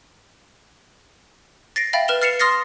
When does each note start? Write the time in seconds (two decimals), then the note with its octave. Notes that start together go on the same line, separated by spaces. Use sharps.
1.76 A6 A#6 C7 D7
1.93 E5 F5 G5 B5 A6
2.08 B4 F6 E7 F7 G7
2.22 F6 A6 C7 C#7 E7 F7
2.39 C6 D#6 F6 A6 A#6 C7